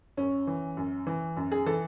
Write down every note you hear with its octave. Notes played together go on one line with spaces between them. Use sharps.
F#2 C#4
E3
F#2
E3
F#2
G#4
E3 A4